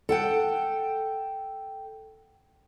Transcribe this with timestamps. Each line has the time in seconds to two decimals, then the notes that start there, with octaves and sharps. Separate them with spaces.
0.09 A4 F#5 G5